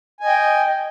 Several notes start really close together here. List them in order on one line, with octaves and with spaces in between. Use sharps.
G#5 D#5 G5